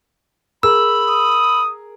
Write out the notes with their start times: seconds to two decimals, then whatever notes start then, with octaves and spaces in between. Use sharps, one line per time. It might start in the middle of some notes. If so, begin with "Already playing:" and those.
0.63 G#4 A#4 B5 E6
1.08 D#6